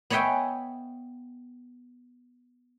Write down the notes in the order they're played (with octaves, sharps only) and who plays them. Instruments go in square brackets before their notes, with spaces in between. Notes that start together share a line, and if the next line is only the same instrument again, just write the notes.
[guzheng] B3 C#5 D#5 E5 G5 G#5